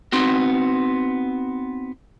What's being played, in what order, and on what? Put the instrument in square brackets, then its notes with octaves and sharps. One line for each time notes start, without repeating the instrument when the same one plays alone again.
[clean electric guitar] B3 C4 D#4 F#4